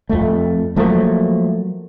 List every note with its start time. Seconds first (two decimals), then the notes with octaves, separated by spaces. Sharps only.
0.09 F2 A3
0.76 F3 F#3 A3 A#3